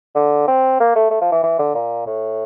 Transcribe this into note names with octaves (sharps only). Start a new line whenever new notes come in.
D3
C4
A#3
A3
A3
F3
E3
E3
D3
A#2
A2